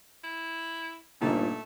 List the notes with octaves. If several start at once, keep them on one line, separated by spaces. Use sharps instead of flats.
E4
G1 A#2 D3 A3 D#4